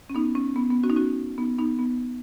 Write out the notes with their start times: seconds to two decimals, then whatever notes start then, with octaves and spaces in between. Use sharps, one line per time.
0.10 C#4
0.15 B3 D#4
0.35 C#4
0.56 B3
0.70 B3
0.83 C#4 F#4
0.90 D#4
0.96 C#4 F#4
1.38 B3 D#4
1.58 B3 D#4
1.79 B3